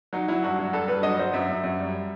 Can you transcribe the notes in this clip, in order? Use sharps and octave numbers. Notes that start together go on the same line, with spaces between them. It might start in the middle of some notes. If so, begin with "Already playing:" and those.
F#3 D#4
F#3 E4
G2 F#4
F#3
G2 A4
G2 B4
F#3 D#5
F#3 C5
F#2 E5
F#2
F#2
G3